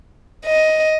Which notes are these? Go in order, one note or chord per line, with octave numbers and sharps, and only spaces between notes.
D#5